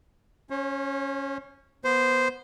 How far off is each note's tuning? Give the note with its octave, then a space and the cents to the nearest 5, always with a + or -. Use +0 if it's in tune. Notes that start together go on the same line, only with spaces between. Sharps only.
C#4 +0 C#5 -45
B3 -15 C5 -10